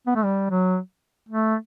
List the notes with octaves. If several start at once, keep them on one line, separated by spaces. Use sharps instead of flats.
B3
A3
G3
F#3
A3